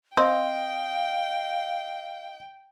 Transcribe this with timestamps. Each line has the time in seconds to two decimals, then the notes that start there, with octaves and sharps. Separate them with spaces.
0.17 C4 D#5 F5 G5